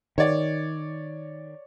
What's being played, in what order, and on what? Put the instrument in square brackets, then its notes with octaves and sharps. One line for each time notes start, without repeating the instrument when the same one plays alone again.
[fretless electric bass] D#3 [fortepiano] C#5 D5